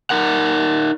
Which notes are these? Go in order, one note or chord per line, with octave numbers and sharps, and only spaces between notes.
D#4 A#4 F#5